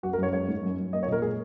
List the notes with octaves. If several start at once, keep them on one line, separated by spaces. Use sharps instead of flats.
F#2 F#4
A#4
F#2 C#5
G#3 C#5
G#2
F#2
F#2
A#3 D#5
C#5
A#2
A#4
G#3 G#4